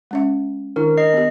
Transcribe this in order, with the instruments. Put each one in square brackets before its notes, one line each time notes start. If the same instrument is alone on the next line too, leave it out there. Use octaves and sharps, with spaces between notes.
[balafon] G#3 C#4 E5
[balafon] D#3 D4 E4 [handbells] A#4
[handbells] D#5 C7
[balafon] B3 G4